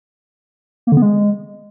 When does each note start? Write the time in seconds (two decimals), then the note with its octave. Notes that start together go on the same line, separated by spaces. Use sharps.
0.87 A#3
0.92 D3
0.97 B3
1.02 G#3